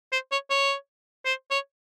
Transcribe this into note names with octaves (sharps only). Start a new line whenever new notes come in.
C5
C#5
C#5
C5
C#5